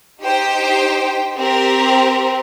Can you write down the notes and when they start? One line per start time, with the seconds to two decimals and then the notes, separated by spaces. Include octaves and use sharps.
0.23 D#4 G4 C5 G5
1.37 C4 G4 A#4